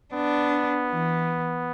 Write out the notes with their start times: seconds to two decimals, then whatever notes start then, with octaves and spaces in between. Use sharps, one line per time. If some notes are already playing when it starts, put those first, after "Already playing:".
0.13 B3 D4
0.90 E3